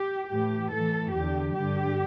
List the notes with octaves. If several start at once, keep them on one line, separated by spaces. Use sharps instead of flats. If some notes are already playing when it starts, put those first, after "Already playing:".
Already playing: G4
A2 E3 G4
A2 E3 A4
E2 D3 G4
G2 D3 G4